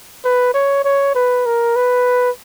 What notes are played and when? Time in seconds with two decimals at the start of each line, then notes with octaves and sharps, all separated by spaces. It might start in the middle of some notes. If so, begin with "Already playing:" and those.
0.24 B4
0.54 C#5
0.85 C#5
1.15 B4
1.46 A#4
1.76 B4